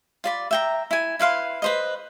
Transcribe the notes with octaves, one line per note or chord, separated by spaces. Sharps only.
F4 D5 B5
E5 G5 A#5
E4 G#5
E4 B4 F5 C6
B4 C5 D#5